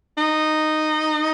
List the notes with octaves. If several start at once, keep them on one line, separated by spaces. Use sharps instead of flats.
D#4